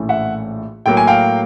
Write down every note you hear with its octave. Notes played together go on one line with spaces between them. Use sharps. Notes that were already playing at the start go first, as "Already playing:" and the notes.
Already playing: A#1 A2 E3 A3 C#4
E5 F#5
A2 F#3 A#3 G5
G#5
F5 G5